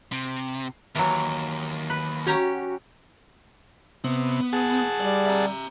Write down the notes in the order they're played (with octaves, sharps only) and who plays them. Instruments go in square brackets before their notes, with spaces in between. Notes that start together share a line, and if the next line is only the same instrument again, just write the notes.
[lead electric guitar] C3
[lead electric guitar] D#2 [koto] E3 F#3
[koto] B4
[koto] C#4 G4 A#5 [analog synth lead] F#4
[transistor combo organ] C3 [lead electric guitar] B3
[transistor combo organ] G#4 F#5 A5
[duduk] G3 [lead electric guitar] D5
[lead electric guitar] E5 A#5